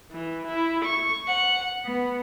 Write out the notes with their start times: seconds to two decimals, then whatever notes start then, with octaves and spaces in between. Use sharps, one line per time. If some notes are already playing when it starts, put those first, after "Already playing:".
0.11 E3
0.48 E4
0.85 C#6
1.28 F#5
1.84 B3